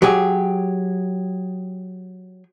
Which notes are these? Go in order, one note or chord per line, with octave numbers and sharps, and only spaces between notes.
F#3 G4 G#4